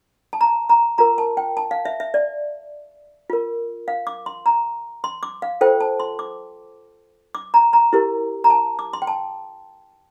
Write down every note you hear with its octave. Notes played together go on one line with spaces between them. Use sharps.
A5
A#5
A#5
F4 A#4 A#5
A5
G5
A5
F5
E5
E5
D5
F4 A#4
F5
D6
C6
A#5
C6
D6
F5
F4 A4 C5 G5
A5
C6
D6
D6
A#5
A#5
E4 G4 A#4
A#5
A5
D6
C6
G5
A5